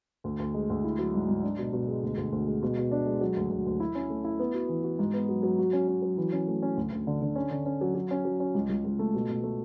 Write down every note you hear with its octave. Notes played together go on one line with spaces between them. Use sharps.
D2
D2
G#3
D2
E4
F#3
G#2
G#2
D4
B2
B2
G#3
D2
D2
D2
G#3
B2
B2
D4
G#3
F#3
D2
D2
D2
E4
C#4
A3
E4
B3
F#4
E3
F#4
G#2
B3
F#3
F#3
F#4
C#4
C#4
F#3
E3
C#4
A3
C#4
D2
D2
D3
D3
C#4
D3
C#4
F#3
F#3
C#4
F#3
C#4
C#2
C#2
C#2
A3
B2
B2
A3